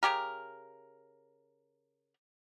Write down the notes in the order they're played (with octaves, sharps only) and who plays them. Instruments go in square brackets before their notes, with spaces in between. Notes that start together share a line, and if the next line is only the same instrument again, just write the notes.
[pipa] C#3 G#3 G4 A#4